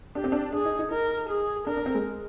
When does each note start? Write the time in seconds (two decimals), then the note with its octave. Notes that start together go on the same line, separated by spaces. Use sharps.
0.15 D4 G4
0.24 C4
0.32 D4
0.53 D4 G#4
0.65 D#4
0.79 D#4
0.91 D#4 A#4
1.29 G#4
1.67 D4 A#4
1.77 D4
1.86 C4
1.95 G#3